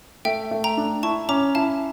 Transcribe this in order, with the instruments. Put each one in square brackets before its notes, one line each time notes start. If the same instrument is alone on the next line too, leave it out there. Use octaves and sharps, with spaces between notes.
[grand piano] A3 [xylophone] E5 G5
[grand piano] A3
[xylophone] G5 A#5
[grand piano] D4
[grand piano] E4 [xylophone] A5 C#6
[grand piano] C#4 [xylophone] A#5 D6
[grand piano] E4 [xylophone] F5 A5